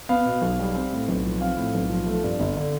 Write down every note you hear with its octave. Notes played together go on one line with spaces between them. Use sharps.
B3 F5
B2
B1
G3
C4
A2
B1
F3
C4 F5
A2
B1
F3
A3
G2
G1
D3